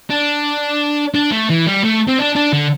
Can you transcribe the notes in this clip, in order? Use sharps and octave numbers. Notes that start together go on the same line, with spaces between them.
D4
D4
A3
E3
G3
A3
C4
D4
D4
D3